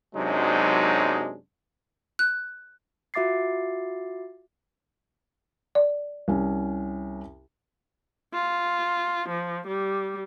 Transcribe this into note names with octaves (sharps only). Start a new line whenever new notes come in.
F#2 C3 F#3 G#3 D4 D#4
F#6
F4 F#4 E5 D6 A6 C7
D5
C2 C#4
F4
F3
G3